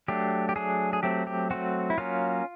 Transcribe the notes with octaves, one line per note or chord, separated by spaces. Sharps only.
F#3 A3 D4 G4
G4
F#3 A3 D4 G#4
G#4
F#3 A3 C4 G4
G4
F#3 A3 C4 F#4
E4
F#3 A#3 C#4 F4